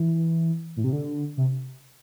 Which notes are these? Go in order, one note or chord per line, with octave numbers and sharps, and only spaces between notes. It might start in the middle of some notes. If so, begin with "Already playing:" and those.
Already playing: E3
A2
C3
D3
C3